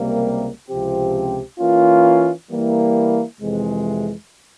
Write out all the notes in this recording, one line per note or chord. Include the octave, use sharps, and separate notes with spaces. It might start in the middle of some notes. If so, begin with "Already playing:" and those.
Already playing: C#2 C3 G3 A#3
C#2 C3 F3 C4 G4
E3 A#3 C#4 F4
E3 G3 A#3 E4
F2 C3 E3 G#3